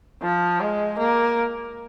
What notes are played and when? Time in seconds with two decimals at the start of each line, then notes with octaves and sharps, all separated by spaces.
0.23 F3
0.61 G#3
0.99 A#3